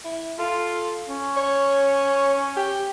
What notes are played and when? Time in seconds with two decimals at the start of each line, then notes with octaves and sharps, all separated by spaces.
0.04 E4
0.39 F4 A4
1.09 C#4
1.37 C#5
2.56 G4